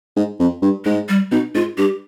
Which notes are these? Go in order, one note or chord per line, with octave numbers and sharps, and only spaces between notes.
G#2
F2
G2
G#2 G#3
G3
B2 D#4
G#2 F4
G2 G4